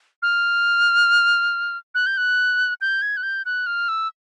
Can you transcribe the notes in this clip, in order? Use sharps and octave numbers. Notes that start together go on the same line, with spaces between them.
F6
F#6
G6
F#6
G6
G#6
F#6
G6
F#6
F6
E6